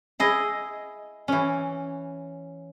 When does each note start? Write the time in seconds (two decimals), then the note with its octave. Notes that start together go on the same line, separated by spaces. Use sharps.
0.20 E4 G#4 D#5
1.28 E3 C#4